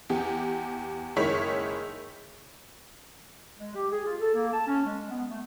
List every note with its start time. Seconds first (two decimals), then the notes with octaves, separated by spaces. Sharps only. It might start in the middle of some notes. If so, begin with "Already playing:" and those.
0.10 E2 G4
1.16 F#1 D#3 G#3 E4 C#5 B6
3.58 G#3
3.76 G4
3.91 G#4
4.05 F4
4.21 A4
4.35 A#3
4.53 A5
4.68 C#4
4.86 G#3
5.10 B3
5.30 A3